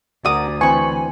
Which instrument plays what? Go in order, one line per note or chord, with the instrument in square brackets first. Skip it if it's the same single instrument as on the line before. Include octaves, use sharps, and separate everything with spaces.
[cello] D2 [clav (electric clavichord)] F#4 A#4 [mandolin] D5 A#5 D#6
[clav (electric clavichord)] E3 C4 C5 [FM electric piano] G#5 [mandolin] B5 C#6